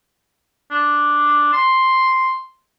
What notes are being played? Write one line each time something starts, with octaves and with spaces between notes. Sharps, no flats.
D4
C6